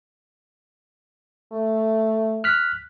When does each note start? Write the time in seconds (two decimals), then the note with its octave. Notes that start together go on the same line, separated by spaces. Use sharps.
1.52 A3
2.44 F6 F#6 B6